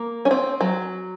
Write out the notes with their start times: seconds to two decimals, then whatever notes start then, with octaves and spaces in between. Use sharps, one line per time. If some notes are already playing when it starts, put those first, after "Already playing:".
Already playing: A#3
0.25 C#4
0.31 C4
0.61 F#3